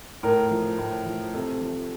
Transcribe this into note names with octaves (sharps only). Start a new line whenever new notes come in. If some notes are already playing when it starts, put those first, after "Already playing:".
A2 A#4
F3
A2
F3
C3 A4
F3